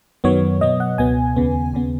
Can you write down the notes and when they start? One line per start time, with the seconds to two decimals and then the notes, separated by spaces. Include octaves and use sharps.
0.24 F#2 D#3 F#3 B3 C#5
0.61 B2 F#3 B3 D#5
0.80 F#5
0.98 C#2 B2 B3 G#5
1.36 D#2 C#3 B3
1.73 D#2 C#3 B3